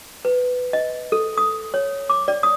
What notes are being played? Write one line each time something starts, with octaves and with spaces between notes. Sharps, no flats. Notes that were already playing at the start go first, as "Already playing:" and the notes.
B4
D#5
A4
D#6
C#5
D6
D5
D#6